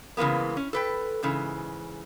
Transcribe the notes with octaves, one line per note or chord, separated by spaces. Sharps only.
C#3 E3 G#3 A#3 B3
C#4
A4 B4 G5
G#2 C#3 E3